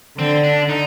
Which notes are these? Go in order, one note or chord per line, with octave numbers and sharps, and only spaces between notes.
D3 C4
D4
D#4